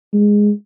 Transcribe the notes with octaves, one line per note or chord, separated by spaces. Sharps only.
G#3